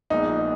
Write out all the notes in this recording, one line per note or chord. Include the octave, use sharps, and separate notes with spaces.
A#1 A#2 G#3 B3 D#4